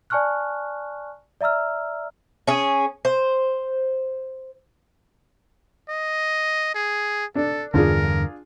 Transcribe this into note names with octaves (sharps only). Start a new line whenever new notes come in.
D5 G#5 A5 C#6 F6 F#6
D5 E5 A#5 E6 F6
C#4 G#4
C5
D#5
G#4
D4 A4
E2 G2 D3 D4 F4 G#4 A#4